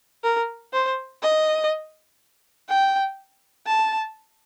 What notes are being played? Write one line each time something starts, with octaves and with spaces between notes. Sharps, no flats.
A#4
C5
D#5
G5
A5